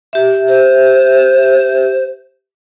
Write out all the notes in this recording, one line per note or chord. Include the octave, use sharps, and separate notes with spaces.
G4 E5
C5